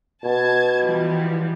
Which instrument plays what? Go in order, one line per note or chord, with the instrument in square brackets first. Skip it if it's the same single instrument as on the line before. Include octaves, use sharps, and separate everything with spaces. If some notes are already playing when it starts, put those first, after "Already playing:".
[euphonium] B2 [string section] A5 G#6
[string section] E3 F3 G3